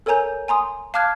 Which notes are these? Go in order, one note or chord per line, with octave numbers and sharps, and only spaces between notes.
A4 A#4 C#5 G#5 A#5 G6
G#5 A#5 C6 D#6
F5 A5 D6 F6 F#6 G#6